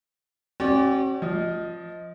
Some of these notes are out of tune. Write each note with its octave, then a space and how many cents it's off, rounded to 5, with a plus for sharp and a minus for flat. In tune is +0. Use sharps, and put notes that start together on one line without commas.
C#4 -45 F#4 +45 D5 -15
F3 +0 D#5 +15